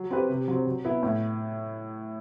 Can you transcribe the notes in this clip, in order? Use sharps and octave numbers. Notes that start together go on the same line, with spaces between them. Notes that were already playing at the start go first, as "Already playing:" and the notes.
Already playing: F#3
C4 G4 B4
C3
F#3 C4
F#3
B3 E4
A2